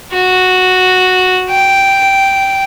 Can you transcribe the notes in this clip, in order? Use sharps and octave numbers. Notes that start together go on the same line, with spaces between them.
F#4
G5